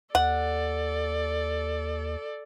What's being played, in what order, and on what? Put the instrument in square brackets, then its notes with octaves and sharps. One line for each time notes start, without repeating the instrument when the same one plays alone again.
[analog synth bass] D#2 [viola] A4 D5 [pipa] F#5